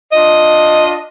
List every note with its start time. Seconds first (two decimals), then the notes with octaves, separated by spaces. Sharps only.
0.13 D4 F4 D#5